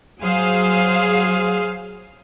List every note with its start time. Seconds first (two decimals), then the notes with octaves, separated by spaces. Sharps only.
0.21 F#3 G#4 C5 F5